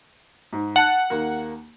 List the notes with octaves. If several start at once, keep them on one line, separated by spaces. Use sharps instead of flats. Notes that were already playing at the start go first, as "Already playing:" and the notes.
G#2
F#5 A5
D#2 A#3